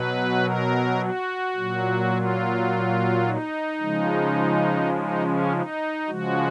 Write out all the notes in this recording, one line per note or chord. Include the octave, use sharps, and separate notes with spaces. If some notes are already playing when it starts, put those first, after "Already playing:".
Already playing: B2 F#3 B4
A#4
F#4
A#2 F#3
F4
D#4
C#3 F3 G#3
D#4
C#4
D#4
C#3 F3 G#3 F#4